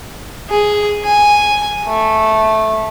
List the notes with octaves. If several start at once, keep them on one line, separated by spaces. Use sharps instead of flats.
G#4
G#5
A3